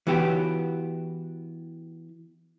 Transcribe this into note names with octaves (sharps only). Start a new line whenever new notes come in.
E3 B3 F#4 G4